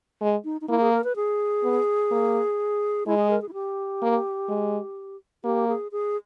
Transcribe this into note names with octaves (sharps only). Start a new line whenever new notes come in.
G#3
D#4
D#4
A#3 E4
G#4
A#4
B4
G#4
B3
A#3
G#3 E4
G#4
A#4
G#4
E4
G4
A#3
G#3
A#3 G4
G#4
G#4